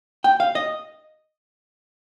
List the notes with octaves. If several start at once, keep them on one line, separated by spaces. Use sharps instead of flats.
G5
F5
D#5